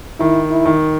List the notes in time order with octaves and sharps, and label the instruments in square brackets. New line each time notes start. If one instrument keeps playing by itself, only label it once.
[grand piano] D#3 [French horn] E4
[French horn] E4
[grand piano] D#3